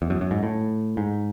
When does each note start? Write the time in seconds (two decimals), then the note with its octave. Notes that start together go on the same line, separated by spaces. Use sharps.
0.02 E2
0.10 F#2
0.21 F#2
0.31 G#2
0.43 A2
0.97 G#2